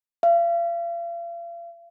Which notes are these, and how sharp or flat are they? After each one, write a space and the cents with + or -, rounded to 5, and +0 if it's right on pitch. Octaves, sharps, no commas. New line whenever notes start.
F5 -40